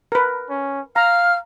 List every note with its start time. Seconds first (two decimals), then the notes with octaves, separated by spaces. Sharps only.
0.12 A#4 B4
0.50 C#4
0.96 F5 A#5 F6